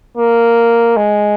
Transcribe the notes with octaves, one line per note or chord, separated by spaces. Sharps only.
A#3
G#3